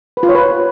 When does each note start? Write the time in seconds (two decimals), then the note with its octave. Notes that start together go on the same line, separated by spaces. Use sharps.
0.17 B4
0.23 F4
0.29 C#5
0.35 B4